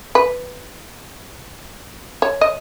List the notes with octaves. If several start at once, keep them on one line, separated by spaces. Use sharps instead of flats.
B4
C#5
D#5